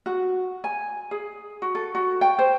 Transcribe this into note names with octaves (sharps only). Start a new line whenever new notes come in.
F#4
G#5
G#4
F#4
A4
F#4
G5
C5